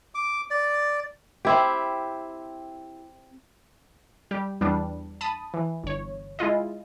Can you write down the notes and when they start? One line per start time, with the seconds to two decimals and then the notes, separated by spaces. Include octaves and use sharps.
0.15 D6
0.51 D5
1.45 C4 E4 G4
4.31 G3 G4
4.61 E2 G3 B3 D4
5.21 A5 B5 D#6
5.54 E3
5.84 G1 C#5
6.39 G#3 E4 F4 D#5